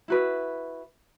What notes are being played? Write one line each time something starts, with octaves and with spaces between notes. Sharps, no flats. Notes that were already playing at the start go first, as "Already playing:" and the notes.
E4 F#4 B4